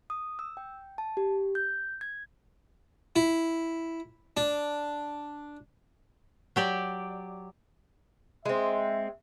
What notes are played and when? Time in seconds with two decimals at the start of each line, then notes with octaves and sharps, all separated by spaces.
0.10 D#6
0.39 E6
0.57 G5
0.98 A5
1.17 G4
1.55 G6
2.01 G#6
3.16 E4
4.37 D4
6.56 F#3 G4 D5
8.45 G#3 C4 E5